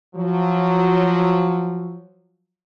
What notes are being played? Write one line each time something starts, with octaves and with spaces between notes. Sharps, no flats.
F3 F#3